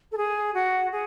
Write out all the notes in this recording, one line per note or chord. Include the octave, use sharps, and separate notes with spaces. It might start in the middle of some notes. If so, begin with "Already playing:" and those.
A4
G#4
F#4
G#4